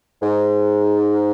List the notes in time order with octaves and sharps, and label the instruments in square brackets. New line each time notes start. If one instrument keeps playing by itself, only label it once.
[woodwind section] G#2